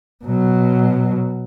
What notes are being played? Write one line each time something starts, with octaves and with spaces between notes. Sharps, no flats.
B2 F#3